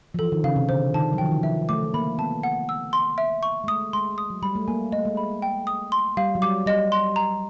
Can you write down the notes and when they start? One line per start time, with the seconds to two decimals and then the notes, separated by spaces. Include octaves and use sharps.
0.14 F3
0.19 E3 A4
0.32 D#3
0.44 C#3 F5
0.56 C3
0.69 D3 C5
0.94 D#3 A5
1.13 F#3
1.18 F3 G5
1.26 D#3
1.32 E3
1.43 F3 E5
1.69 A3 D6
1.94 A#3 B5
2.18 B3 A5
2.43 F#5
2.69 E6
2.93 C6
3.18 E5
3.43 C#6
3.64 G#3
3.68 A3 D#6
3.93 G#3 C6
4.18 D#6
4.30 F#3
4.42 G3 B5
4.56 A3
4.68 A#3 G#5
4.92 A3 D#5
5.05 G#3
5.17 B5
5.42 G5
5.67 D#6
5.92 C6
6.17 G3 F5
6.35 F#3
6.42 G3 D6
6.66 G3 D#5
6.92 C6
7.16 A#5